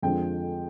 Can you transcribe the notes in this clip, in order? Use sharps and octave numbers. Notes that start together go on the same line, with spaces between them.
F2 D3 F3 G#3 C4 G5